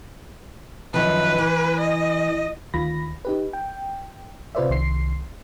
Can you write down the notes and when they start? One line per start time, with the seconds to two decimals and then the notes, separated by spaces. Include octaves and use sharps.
0.94 F#2 D#3 F3 B4
1.38 E3
1.80 D#5
2.74 D2 D#3 F4 B5 A#6
3.25 D#4 G4 B4
3.53 G5
4.55 C3 F4 B4 C5 D5 E5
4.70 C2 D#3 C6 C7